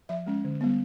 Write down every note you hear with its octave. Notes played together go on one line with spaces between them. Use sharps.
F3 E5
G#3 C#4
D3
G3 B3